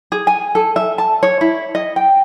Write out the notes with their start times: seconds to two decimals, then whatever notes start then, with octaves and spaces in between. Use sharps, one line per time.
0.12 G#4
0.27 G#5
0.55 A4
0.76 E5
0.98 A5
1.23 C#5
1.41 E4
1.75 D#5
1.96 G5